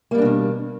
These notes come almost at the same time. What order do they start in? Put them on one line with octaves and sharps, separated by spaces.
A#3 G3 D4 B2 D#3